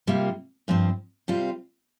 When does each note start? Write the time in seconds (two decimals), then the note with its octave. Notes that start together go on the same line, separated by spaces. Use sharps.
0.07 C3 G3 A#3 F4
0.68 G2 F3 C4
1.28 C3 G3 C4 F4